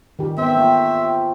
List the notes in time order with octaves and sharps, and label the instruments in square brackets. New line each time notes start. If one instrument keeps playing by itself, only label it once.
[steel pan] D#3 G4
[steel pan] B3 [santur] C4 D5 G5 [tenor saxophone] E5
[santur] A3 C4 F4 [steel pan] A#3
[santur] G4